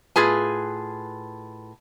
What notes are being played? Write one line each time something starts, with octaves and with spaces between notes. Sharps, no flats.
A2 F4 G#4 B4 G#5